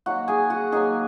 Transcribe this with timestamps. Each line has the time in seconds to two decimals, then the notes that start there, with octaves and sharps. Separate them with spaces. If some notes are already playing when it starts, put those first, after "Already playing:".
0.06 D#3 F#3 A#3 F#4 F#5
0.28 G#4 G#5
0.50 F#4 F#5
0.72 D#3 F#3 A#3 G#4 G#5